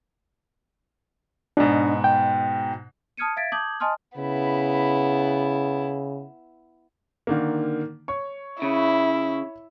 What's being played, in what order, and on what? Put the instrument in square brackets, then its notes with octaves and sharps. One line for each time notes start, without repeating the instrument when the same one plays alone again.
[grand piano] G#2 B2 [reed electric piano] D4
[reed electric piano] G5
[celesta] A5 D#6 F6 G#6 C#7 D#7
E5 F5 G#6 A6 B6 D7
A5 D6 D#6 G6 G#6 F#7
D#5 G#5 A5 C6 D#6 F6
[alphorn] C#3 [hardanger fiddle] B3 E4
[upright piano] D3 D#3 A#3
C#5 C#6
[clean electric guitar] C#3 [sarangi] E4